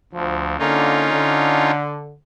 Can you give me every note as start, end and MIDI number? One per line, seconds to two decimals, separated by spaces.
0.12 0.56 38
0.12 0.58 53
0.59 1.11 50
0.59 1.11 58
0.59 1.71 61
0.59 1.71 63
0.59 1.71 65
1.12 2.15 50